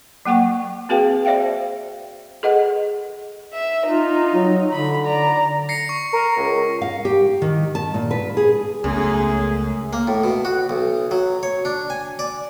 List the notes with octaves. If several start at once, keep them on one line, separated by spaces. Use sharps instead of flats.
F#3 A#3 F#5 G5 C#6
C4 F#4 G#4 B4 F5 G5
C5 D5 E5 F5 G5
G#4 A4 B4 D#5 F#5
E5
D#4 F4
F#3
D3 B5
D5 A#5
A#6 C7 C#7
C#6
A#4
C#2
F5
G4
D#3
A5
A#2
B4
G#4
C#2 F#2 A3 B3 D4 G#4
A#3
A2
B2
F#4
B1
F#3
C#5
D4
G#5
D5